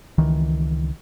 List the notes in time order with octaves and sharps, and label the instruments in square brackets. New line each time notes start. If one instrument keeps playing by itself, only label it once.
[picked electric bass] C#2 D#3 E3